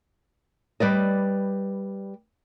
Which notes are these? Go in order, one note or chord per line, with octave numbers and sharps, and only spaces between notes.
G3 B4 D5 D#5